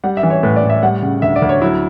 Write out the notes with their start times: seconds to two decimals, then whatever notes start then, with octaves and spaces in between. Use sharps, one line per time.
0.04 G3 F#5
0.17 E5
0.23 E3
0.30 C#5
0.43 A2 B4
0.56 D5
0.63 A2
0.70 E5
0.83 G3 F#5
1.02 C#3
1.22 D2 E5
1.36 D5
1.42 D2
1.49 C#5
1.62 F#3 E4